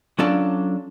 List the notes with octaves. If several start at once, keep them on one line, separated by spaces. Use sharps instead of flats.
F#3 C#4 D4 F4 A4 D5